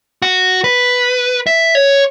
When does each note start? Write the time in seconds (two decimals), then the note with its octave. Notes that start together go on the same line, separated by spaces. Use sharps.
0.22 F#4
0.64 B4
1.47 E5
1.75 C#5